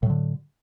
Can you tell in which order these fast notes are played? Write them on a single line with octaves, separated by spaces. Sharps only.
A2 F#3 D3